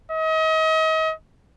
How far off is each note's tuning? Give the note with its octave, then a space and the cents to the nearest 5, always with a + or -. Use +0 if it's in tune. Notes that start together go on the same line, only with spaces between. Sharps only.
D#5 +35